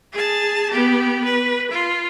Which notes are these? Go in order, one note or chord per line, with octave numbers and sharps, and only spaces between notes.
G#4 A5
B3 G4
B4
F4